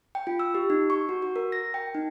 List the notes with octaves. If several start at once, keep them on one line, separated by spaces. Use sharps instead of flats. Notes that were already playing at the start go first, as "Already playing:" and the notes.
G5
F4
E6
G4
D#4
C#6
F#4
F#4
A#4
A#6
G5
D#4